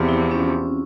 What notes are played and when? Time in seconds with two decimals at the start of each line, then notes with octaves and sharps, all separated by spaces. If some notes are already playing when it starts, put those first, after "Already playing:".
Already playing: E2 C3 F3 F4
0.08 E4
0.21 C4
0.31 C#4